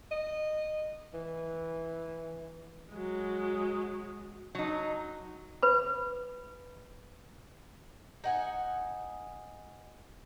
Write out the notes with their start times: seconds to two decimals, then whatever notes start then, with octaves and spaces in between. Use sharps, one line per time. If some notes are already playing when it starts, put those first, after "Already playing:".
0.12 D#5
1.14 E3
2.91 F#3 G#3
4.55 F#3 D#4
5.63 B4 B5
8.24 D#4 F#5 G#5